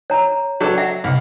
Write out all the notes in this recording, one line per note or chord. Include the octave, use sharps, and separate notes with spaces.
C#5 A#5
F#3 D4 A4
E5 F#5
C2